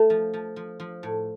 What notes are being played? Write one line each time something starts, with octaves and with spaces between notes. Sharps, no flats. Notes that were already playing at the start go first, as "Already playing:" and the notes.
Already playing: A3
F3
F3
F3
F3
A2